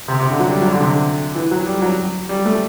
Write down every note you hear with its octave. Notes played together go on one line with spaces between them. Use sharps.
C3
C3
D3
F#3
G3
F#3
D3
C3
D3
E3
F#3
G3
F#3
G3
A3